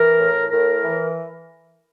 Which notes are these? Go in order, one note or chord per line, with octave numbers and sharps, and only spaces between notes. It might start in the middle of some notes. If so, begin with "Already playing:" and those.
Already playing: E3 A#4
A2
A2 A#4
E3